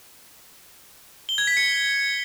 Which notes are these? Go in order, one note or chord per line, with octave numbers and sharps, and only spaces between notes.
G7
G#6
B6
C#7